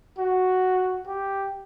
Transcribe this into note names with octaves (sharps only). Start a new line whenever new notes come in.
F#4
G4